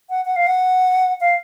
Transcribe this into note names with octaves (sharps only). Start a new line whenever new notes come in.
F#5
F#5
F5
F#5
F5